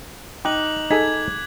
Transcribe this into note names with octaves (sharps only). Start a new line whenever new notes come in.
D#4 G5 D6 F#6 F#7
D#4 G#4 A4 G#6 B6